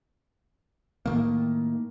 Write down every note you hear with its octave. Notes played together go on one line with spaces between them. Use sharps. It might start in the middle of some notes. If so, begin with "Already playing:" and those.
A2 D#3 A#3